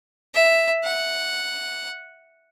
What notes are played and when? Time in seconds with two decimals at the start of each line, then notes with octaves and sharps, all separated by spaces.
0.35 E5
0.84 F#5